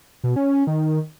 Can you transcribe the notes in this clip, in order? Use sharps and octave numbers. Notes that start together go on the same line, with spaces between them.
B2
C#4
D#3